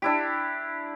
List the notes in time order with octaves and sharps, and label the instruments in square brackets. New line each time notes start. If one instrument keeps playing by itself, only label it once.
[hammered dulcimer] D4 E4 G4